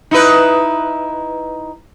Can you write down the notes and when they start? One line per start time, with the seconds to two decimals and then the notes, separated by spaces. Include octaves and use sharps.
0.11 D#4 E4 B4